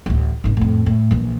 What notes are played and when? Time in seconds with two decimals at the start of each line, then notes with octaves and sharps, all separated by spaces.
0.06 A1 D2
0.44 G#1 C#3
0.57 F2 A2
0.86 A2
1.11 A#1 E3